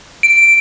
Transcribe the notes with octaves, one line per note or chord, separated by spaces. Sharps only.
D7